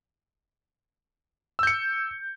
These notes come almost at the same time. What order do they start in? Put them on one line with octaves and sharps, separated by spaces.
E6 G6 C#7